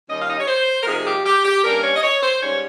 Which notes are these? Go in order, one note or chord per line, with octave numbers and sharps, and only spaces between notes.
D#2 D#3 G3 C#4 D#5
F5
D#5
C#5
C5
A#4
C3 F3 A#3 D#4 G#4
G4
G4
G4
G2 G3 A#3 C#4 A#4
C#5
D#5
C#5
C5
G#2 G3 C#4 C#5